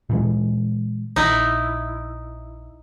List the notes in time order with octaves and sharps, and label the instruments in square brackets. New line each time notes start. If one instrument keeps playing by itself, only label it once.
[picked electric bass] A#2 E3 G#3
[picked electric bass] A#1 [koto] D#4 E4